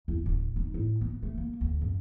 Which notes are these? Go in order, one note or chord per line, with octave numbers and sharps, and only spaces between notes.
E2
D1
D#4
A2
B3
A3
A#3
D2
F#2